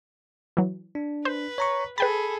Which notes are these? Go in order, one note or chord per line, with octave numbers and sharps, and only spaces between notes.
E3 F#3
D4
B4 C5
C#5 A#5 C#6
G#4 A4 B4 G5 B5 A6